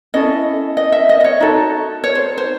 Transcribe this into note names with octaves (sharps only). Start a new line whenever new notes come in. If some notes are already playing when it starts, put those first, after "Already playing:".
C#4 E4 A4 D#5
D#5
E5
D#5
D#5
C#5
D#4 F#4 A4
C#5
C5
C5